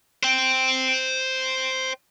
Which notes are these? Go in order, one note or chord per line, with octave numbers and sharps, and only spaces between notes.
C5 G5